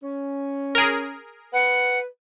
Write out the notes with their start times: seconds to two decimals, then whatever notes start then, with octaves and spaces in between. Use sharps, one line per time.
0.03 C#4
0.75 G#4 A#4
1.53 B4 F#5